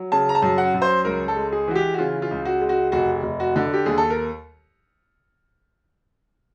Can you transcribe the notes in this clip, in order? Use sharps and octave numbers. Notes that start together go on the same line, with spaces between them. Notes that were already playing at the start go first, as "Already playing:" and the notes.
Already playing: F#3
C#3 A5
A#5
A5
F#2
F#5
F#2
C5
C#2 A#4
A4
G#3
G#4
E3 F#4
G4
F#4
C#3 F4
F4
C#2
F#4
G#3
F#4
F1 F#4
F1
F#4
D3
G4
D#2 G#4
A4
A#4